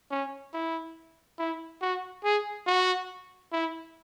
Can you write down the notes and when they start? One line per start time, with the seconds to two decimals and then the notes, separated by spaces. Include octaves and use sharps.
0.11 C#4
0.53 E4
1.39 E4
1.82 F#4
2.24 G#4
2.67 F#4
3.52 E4